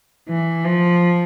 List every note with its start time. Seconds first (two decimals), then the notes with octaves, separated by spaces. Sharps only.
0.29 E3
0.65 F3